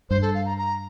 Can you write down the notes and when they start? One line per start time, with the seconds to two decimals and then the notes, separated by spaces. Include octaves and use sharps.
0.10 G2 C5
0.22 A4
0.35 F5
0.45 A#5
0.58 A#5